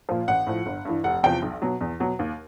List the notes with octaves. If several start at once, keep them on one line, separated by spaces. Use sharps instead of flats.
A#2 F3
A1 F#5
A2 F3
G1
G2 E3
F1 F#5
E2 C3 F3 G5
B1
B2 F#3
E2
B2 F#3
D#2